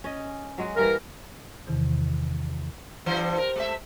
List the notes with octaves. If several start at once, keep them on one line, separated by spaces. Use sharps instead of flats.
C#4 D#5
F#3 G#3 F#4
E3 G3 A#3 A#4
E2 C3 D#3 E3
G2 E3 C5
A#4
G#3 A3 E5